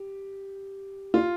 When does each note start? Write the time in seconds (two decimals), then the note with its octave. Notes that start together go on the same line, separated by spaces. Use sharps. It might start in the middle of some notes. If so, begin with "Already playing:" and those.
Already playing: G4
1.14 F4